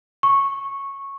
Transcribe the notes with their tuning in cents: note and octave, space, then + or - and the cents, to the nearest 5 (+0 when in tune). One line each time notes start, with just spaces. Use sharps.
C#6 -10